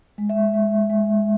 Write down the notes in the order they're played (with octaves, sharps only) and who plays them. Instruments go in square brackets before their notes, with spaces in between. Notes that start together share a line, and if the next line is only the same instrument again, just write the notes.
[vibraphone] G#3
E5
G#3
G#3